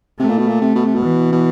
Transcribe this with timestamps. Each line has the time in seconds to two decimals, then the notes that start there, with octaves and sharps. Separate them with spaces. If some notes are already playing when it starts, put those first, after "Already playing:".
0.20 C3 A3
0.29 A#2
0.38 B2
0.48 A#2
0.61 C3
0.75 B2
0.85 C3
0.95 B2
1.04 E3
1.32 B2